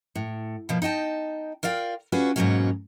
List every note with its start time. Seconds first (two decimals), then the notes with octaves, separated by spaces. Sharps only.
0.15 A2
0.69 B2 F3 A#3
0.82 D#4 D#5 G5 A5
1.63 F4 A#4 D5 F5 G5
2.12 C#4 F4 F#4 G#4 B4 D5
2.36 G#2 B2 D3 F#3 A#3 C#4